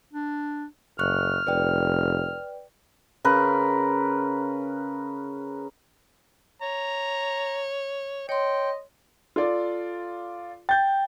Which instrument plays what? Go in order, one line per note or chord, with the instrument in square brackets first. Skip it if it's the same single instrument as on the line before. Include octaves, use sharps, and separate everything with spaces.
[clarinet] D4
[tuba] F#1 [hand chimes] C#6 F#6 [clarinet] F6
[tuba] F1 [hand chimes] B4 D5 G5
[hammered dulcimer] C#3 A#4 B4
[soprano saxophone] C#5 [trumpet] A#5
[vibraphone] C#5 C6 [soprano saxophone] D#5 [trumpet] G5
[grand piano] F4 A4 D5
[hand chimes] G5 [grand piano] G6 A6